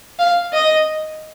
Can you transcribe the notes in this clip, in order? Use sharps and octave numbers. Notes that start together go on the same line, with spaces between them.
F5
D#5